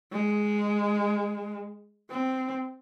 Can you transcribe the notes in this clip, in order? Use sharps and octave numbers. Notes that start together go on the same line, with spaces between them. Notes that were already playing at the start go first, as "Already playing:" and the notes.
G#3
C4